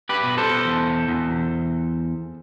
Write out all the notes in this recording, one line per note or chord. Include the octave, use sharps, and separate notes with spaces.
G4 B4
B2
A4 C5
E2
E2